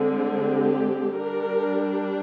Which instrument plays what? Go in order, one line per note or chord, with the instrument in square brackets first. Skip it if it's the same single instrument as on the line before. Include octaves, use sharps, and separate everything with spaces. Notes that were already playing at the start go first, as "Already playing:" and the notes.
Already playing: [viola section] D3 G#3 C4
G4
G3 D4 A#4